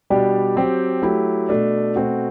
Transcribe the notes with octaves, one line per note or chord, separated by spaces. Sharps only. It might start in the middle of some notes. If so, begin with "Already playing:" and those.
B2 G3 D4 G4
F#3 C4 G4
F#3 A3 E4 G4
B2 A3 D4
B2 A3 C4 F#4